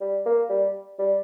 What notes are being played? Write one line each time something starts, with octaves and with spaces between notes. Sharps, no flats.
G3
A#3
G3
G3